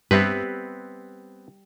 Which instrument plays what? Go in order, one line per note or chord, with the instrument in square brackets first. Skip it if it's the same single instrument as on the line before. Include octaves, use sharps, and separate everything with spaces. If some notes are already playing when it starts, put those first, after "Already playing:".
[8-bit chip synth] G2 [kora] G3 C5 E5 [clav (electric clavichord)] B3 C4 B4